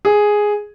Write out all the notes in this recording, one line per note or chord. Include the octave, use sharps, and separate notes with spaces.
G#4